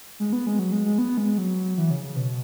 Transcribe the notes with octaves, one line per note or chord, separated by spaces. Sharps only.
G#3
B3
G#3
F#3
G#3
G#3
B3
G#3
F#3
E3
C#3
C#3
B2